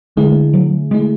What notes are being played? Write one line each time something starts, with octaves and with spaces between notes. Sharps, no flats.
D3 G#3 A3 E4 G#4
F#3
D3 G#3 A3 E4 G#4